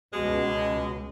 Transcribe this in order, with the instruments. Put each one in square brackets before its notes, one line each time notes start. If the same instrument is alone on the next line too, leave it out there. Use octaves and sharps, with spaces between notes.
[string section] C#2 [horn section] B2 G#3